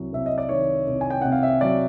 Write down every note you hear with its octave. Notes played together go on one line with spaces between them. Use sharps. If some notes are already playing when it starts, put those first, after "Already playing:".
Already playing: C2 F#3
C2 E5
D#5
D5
D#3 C#5
C2
G#5
G5
C3 F#5
F5
E5
F#3 D5